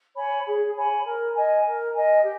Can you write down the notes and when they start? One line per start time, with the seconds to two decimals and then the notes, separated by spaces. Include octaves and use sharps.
0.15 C#5 G#5 B5
0.45 G#4
0.74 C#5 G#5 B5
1.04 A#4
1.34 D#5 G#5
1.64 A#4
1.94 D#5 G#5
2.23 G4